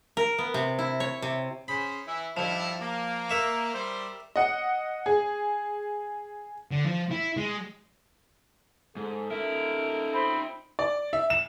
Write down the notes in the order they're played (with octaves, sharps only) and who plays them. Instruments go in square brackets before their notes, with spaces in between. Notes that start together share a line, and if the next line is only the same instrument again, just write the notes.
[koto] A#4
B3
C3
E4
C#5
C3
[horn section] C#4 G#4 C5 [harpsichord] B5
[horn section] E3 E4
[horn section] G2 D#3 E4 [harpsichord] F3
[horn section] A#3
[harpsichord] A#4 E5 C#6
[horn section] G3 C5
[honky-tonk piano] D#5 F#5
G#4
[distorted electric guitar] D3
F3
E4
G#3
[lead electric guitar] G#2 [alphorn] A4
[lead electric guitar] D#4 E5 [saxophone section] A#4
[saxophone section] C4 [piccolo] B5
[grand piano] D5
E5
E7